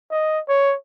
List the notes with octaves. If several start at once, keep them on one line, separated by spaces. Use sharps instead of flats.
D#5
C#5